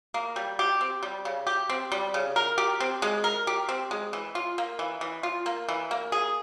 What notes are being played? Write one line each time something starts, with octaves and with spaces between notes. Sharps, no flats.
A#3
G3
G4
C4
G3
C#3
G4
C4
G3
C#3
A#4
G4
C4
G#3
A#4
G4
C4
G#3
E3
F4
A#3
E3
E3
F4
A#3
E3
A#3
G#4